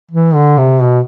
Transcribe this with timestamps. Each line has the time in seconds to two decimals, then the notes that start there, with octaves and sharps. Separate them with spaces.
0.11 E3
0.34 D3
0.58 C3
0.81 B2